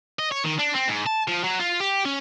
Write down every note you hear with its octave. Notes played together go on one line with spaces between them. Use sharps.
D#5
C#5
D#3
D4
C4
G#2
A5
F3
F#3
F4
G4
C#4